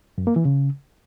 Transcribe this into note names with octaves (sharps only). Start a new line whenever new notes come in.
F#2
A#3
E3
C#3